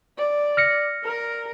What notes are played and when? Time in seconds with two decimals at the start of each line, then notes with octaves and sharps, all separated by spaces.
0.18 D5
0.57 F6 A#6 C#7
1.04 A#4